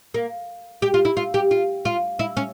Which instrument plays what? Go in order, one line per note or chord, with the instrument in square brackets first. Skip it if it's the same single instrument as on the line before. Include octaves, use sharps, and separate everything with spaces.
[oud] A#3
G4
F4
E4
F4
G4
F4
F4
E4
C#4